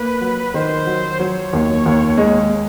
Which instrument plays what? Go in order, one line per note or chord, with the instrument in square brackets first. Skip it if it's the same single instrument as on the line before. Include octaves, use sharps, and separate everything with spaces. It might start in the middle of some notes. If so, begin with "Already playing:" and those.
Already playing: [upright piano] A#3 [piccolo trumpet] B4
[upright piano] F#3
[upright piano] D#3 [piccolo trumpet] C5
[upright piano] F#3
[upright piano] F#3 [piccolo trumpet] C#5
[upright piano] D#2
D#2
G#3